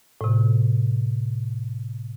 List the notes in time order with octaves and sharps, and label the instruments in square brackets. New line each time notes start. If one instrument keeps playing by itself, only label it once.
[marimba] A2 C3